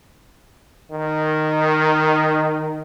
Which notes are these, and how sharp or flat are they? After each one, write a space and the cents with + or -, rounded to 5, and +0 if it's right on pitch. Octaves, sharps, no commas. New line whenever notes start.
D#3 -5